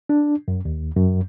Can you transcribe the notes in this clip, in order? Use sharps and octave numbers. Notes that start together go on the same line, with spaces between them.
D4
F#2
D#2
F#2